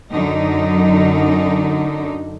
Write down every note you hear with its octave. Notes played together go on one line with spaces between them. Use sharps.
F#2 D3 F#3 D#4